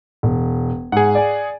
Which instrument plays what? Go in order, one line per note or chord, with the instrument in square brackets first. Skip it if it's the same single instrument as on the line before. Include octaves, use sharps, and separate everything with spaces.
[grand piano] E1
[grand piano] G#2 [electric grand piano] G#4 F#5
[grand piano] D5 G#5